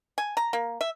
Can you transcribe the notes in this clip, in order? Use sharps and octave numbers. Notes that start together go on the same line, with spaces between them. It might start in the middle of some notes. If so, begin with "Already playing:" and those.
G#5
A#5
A#3
E5